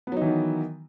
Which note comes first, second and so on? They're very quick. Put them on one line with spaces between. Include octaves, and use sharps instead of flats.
B3 F#3 D#4 E3 D#3